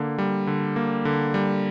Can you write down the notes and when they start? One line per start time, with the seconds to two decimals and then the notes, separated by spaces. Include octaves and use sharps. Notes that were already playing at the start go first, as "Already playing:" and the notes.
Already playing: D3 A#3
0.18 G3
0.47 D3
0.76 A#3
1.05 D3
1.34 G3